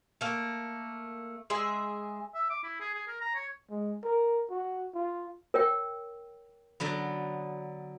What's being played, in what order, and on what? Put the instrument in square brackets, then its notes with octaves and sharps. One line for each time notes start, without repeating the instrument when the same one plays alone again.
[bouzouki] A3 A#3
G#3 G#4 E5
[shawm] E5
D6
E4
G#4
G#4
A#4
A#5
C#5
[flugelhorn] G#3
A#4
F#4
F4
[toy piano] A#4 C#5 G5
[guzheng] D3 F#3 B3